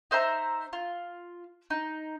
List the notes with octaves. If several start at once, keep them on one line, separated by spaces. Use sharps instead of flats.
D#4 C5 E5 A#5
F4
D#4